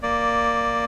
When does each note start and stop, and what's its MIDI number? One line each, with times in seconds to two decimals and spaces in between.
0.03 0.85 58
0.03 0.85 74